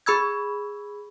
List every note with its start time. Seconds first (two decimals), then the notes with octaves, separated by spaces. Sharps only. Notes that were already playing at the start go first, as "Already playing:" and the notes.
0.06 G#4 B5 E6 G#6